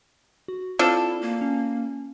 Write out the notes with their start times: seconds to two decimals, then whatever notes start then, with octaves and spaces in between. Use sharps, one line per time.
0.48 F#4
0.79 F3 C4 D4 E4 A4
1.21 A#3
1.41 C#4